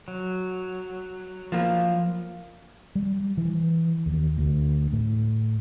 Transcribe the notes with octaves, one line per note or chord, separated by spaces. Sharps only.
F#3
F3 A#3 F4
G3
E3
D#2
D2
A2